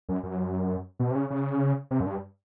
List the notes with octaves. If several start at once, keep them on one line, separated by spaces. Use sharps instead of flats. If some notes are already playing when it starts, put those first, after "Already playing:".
F#2
F#2
B2
C3
C#3
C#3
C3
F#2
G2